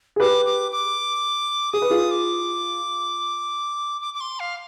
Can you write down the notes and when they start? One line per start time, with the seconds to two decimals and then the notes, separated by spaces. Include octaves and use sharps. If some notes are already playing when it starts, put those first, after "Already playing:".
0.16 G#4
0.20 G4 B4 D6
0.45 D6
0.72 D6
1.73 G#4 D#6
1.82 B4
1.90 F4 G#4
2.11 D6
4.01 D6
4.14 D6
4.21 C6
4.40 F5